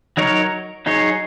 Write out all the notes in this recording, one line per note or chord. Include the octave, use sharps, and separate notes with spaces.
F#3 D#4 A#4 C#5
F#3 D#4 G#4 C#5